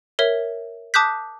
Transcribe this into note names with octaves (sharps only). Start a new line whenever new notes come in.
A#4 C#5 E5
A5 D6 D#6 F#6 G6 B6